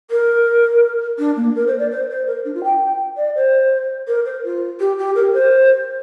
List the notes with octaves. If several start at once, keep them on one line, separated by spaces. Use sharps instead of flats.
A#4
D4
A#3
A#4
C5
D5
C5
C5
A#4
D4
F4
G5
D5
C5
A#4
C5
F4
G4
G4
A#4
C5